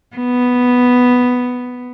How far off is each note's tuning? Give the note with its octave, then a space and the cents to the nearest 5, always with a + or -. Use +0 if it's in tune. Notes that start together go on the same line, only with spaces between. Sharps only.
B3 +0